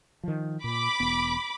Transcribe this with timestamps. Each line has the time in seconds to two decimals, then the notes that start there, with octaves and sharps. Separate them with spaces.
0.23 D#3 F3
0.64 A#2 B5 D6
1.00 E1 B3